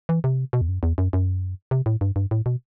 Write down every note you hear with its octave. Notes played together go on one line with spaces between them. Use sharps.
E3
C3
B2
E2
F#2
E2
F#2
F#2
C3
A2
G2
G2
A2
B2